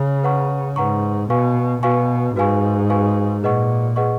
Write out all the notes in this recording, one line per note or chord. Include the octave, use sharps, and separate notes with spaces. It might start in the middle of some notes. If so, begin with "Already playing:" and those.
Already playing: C#3
B4 F#5 A#5 C#6
G#2 B4 F#5 A#5 C#6
B2 F#4 B4 F5 G#5 C#6
B2 F#4 B4 F5 G#5 C#6
G#2 F#4 B4 F5 G#5 C#6
F#4 B4 F5 G#5 C#6
A#2 G#4 B4 D#5 F#5 C#6
G#4 B4 D#5 F#5 C#6